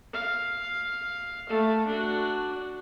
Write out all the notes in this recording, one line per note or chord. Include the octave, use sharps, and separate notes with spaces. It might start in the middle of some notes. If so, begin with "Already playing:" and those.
F5
A3 A4
D4 F#4